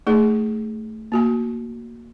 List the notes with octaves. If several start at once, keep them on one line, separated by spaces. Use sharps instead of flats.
A3 D#4 G#4 D5
A#3 F#4 G#5